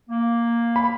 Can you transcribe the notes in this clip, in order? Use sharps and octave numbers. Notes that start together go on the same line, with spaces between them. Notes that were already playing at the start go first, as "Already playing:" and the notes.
A#3
B5